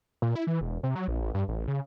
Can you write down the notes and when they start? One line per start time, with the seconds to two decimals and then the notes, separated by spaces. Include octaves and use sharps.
0.22 A#2
0.35 E4
0.47 E3
0.61 E1
0.83 C3
0.95 F#3
1.08 A#1
1.21 A1
1.34 G2
1.48 A1
1.68 C#3